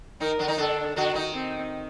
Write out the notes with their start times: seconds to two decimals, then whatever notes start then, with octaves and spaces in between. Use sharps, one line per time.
0.20 D#3 D#4 A#4
0.39 D3 D4
0.48 D#3 D#4
0.58 D3 D4 A4
0.96 D3 D4 F#4
1.14 D#3 D#4
1.34 C4